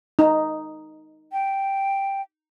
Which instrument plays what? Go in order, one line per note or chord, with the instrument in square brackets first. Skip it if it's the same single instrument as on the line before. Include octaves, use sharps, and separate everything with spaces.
[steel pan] D#4
[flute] G5